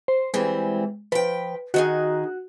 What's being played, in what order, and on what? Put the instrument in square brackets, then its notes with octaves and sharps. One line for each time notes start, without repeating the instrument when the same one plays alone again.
[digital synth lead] C5
[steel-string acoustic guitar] E3 G3 C4 [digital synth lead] G#3
[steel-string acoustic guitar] F3 G5 [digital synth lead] B4
[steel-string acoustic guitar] D#3 D#4 G#4 [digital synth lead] F#4